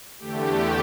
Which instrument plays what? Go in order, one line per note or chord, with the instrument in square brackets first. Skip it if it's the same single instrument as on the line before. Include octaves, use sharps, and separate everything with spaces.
[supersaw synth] E2 D3 A3 G4